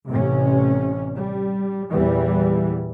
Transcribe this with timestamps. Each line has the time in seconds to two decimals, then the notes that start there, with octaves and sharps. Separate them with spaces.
0.10 A1 C3 C#4
1.15 G3
1.89 E2 A#2 E3 G3